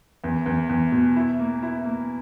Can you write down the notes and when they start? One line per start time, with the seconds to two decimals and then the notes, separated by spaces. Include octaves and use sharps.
0.24 E2
0.46 E2
0.69 E2
0.92 B2
1.16 E4
1.39 A#3
1.63 E4
1.85 A#3